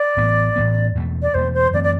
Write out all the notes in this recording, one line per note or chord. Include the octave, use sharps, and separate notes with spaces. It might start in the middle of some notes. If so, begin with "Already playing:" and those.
Already playing: D5
A1 A2 E3 B3
A1 A2 E3 B3
E2 B2 A3
D5
E2 B2 A3 C5
C5
F#2 E3 A3 C4 D5
D5